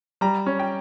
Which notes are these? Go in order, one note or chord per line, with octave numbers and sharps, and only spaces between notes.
G3 A#5
C#4
G5